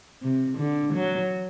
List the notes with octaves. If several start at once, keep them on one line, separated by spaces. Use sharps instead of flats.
C3
D3
F#3